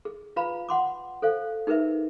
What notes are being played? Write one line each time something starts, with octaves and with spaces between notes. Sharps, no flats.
G#4
F4 B4 F5 A#5 B5
F#5 C6 D6
A4 C5 F5
D#4 G#4 A#4 B4 E5